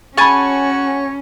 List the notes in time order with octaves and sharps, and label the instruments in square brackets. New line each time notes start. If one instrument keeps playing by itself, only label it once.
[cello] C#4 [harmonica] F#4 C#5 [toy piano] G#4 B5 [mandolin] G#5 A5 C#6